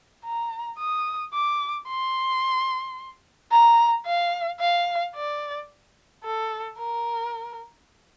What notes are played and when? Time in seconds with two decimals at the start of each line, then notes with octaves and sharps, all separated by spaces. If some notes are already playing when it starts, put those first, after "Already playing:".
0.25 A#5
0.79 D#6
1.34 D6
1.88 C6
3.52 A#5
4.06 F5
4.61 F5
5.15 D5
6.25 A4
6.79 A#4